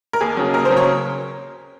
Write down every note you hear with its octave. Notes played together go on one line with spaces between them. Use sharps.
A#4
D#2 G#4
C#3 F#3
D#2 A#4
C5
C#3 F#3
C#5